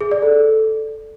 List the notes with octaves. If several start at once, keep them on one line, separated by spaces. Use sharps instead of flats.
G#4
D5
A4